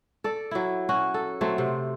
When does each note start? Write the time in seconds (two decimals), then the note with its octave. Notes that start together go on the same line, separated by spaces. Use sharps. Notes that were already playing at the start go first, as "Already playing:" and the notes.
0.24 A4 D5
0.51 F#3 E4
0.89 C#4 F#4
1.14 A4
1.41 F#3 A3 C4
1.58 C3